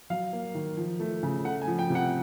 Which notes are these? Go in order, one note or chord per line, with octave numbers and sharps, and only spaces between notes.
F#3 F5
A#3
D#3
F3
A3
C#3
A3 F#5
G#5
F3
G5
C3
F#5